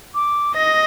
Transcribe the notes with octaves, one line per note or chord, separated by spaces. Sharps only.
D6
D#5 A#6